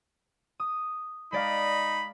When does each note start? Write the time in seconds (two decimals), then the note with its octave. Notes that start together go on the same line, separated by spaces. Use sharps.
0.60 D#6
1.32 G#3 D#4 D5 D#5 F5 B5